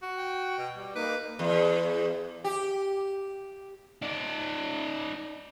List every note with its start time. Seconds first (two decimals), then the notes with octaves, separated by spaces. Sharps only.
0.02 F#4
0.18 G5
0.58 B2
0.77 G3
0.96 A#3 D#4 B4 D6
1.39 E2
2.44 G4
4.02 D#4 D5